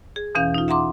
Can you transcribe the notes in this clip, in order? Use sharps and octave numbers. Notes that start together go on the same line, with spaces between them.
G#4
E2 B2 E3 C#4 F5 G6
D#4 F4
E5 F#5 A#5 C6 D6